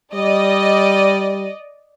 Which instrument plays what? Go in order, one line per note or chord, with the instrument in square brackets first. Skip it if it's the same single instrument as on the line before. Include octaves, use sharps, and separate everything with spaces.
[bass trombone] G3 [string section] D5 D#5